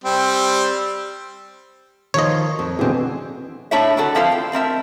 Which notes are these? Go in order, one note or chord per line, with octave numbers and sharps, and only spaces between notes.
G3 C4
D#3 F3 C5 C#5 D#5
F2
B2 D3 E3 C4 G#4
A2 A3 D4 E4 C#5 E5
D3 A3 F#4 A4
F3 C4 E4 F4 A4 C5
G5
A3 C4 A#4 E5